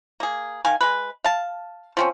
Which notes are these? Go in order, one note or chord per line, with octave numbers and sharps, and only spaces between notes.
A#3 G#4
D#3 F5 G#5
G#3 B4
F5 A5
F3 C4 C#4